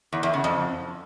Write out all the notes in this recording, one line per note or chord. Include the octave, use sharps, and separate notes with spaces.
E2
E2
C#3
F2